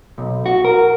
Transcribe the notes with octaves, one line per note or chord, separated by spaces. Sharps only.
B1
F#4
A#4